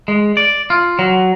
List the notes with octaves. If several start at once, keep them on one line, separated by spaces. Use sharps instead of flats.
G#3
D5
F4
F#3